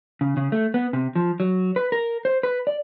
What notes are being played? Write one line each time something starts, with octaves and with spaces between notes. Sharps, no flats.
C#3
C#3
A3
B3
C3
F3
F#3
B4
A#4
C5
B4
D5